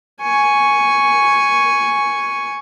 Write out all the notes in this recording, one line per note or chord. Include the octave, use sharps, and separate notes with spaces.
G#5 C#6